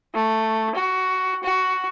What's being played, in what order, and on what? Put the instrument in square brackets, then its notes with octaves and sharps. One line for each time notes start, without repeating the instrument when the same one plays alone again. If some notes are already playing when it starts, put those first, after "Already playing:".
[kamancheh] A3
F#4
F#4